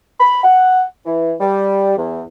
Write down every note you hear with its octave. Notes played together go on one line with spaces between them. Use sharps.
B5
F#5
E3
G3
E2